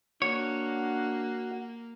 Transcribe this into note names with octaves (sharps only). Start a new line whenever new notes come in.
A#3 D4 F#4 C#5 F#5